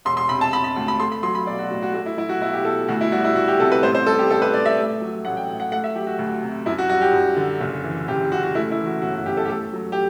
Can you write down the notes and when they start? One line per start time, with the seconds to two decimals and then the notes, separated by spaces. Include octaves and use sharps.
0.05 E1 C6
0.17 C6
0.29 C3 B5
0.41 A5
0.53 E1 B5
0.64 B5
0.76 D2
0.88 B5
1.00 A3 C6
1.12 B5
1.23 F#3 C6
1.35 B5
1.47 B1 D5
1.59 F#4
1.71 A2 F#4
1.83 F#4
1.94 A3 F#4
2.06 E4
2.17 F#3 E4
2.29 F#4
2.41 B1 E4
2.53 G4
2.65 B2 A4
2.88 D2 F#4
3.01 E4
3.12 G3 F#4
3.24 E4
3.35 D2 F#4
3.48 G4
3.59 C3 A4
3.72 B4
3.83 A1 C5
3.95 C5
4.07 G3 A4
4.19 G4
4.30 A1 A4
4.42 B4
4.54 A2 D5
4.66 E5
4.78 A3
5.01 F#3
5.25 A1 F#5
5.37 G5
5.48 A2
5.60 F#5
5.72 A3 F#5
5.84 E5
5.95 F#3 G4
6.07 F#4
6.19 D2
6.43 C3
6.66 F#2 E4
6.78 F#4
6.89 G3 F#4
7.01 G4
7.13 F#2
7.37 D3
7.61 F#1
7.84 E3
8.08 F#1 G4
8.32 F#2 F#4
8.43 F#4
8.55 A3 E4
8.71 E4
8.79 E3
8.86 F#4
9.02 G1 F#4
9.14 F#4
9.26 F#2 G4
9.37 A4
9.45 G4
9.49 A3 A4
9.73 F#3
9.92 G4